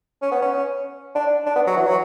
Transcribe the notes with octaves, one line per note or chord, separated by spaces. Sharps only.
C#4
B3
C#4
D4
D4
B3
F#3
E3
F#3